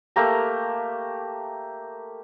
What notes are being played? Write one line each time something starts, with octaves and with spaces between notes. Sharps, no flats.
A3 A#3 G4 A#5